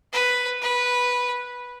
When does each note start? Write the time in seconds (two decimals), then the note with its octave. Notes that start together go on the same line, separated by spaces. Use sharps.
0.13 B4
0.62 B4